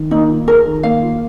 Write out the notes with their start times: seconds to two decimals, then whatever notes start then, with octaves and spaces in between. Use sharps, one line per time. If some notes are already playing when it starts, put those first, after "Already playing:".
Already playing: D#3
0.11 A#3 D#4
0.29 F4
0.47 G#4 A#4
0.66 D#3
0.83 A#3 F5
1.02 F4